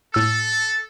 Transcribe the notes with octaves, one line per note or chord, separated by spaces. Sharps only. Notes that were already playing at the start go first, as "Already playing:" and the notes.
A2 A4 E6